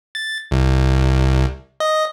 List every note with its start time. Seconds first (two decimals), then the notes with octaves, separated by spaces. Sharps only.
0.15 A6
0.51 C2
1.80 D#5